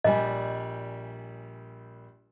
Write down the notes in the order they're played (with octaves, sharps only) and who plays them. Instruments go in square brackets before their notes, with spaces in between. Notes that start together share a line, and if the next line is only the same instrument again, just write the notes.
[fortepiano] A#1 G3 G#5 [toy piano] D#5